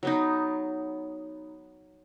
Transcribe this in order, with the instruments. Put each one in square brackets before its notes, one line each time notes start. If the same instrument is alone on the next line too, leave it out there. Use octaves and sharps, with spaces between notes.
[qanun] F#3 B3 D#4